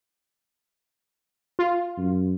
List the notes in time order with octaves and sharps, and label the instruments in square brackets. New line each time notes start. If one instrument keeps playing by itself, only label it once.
[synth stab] F4
[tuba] F#2